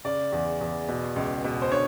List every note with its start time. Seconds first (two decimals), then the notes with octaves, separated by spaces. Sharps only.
0.05 C#3 D5
0.32 E2
0.61 E2
0.89 B2
1.16 C#2
1.44 B2
1.62 C5
1.71 D3 C#5